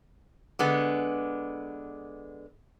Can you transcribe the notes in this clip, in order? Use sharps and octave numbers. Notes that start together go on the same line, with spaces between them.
D3 G#3 B3